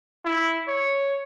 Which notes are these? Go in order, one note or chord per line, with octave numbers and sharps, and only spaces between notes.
E4
C#5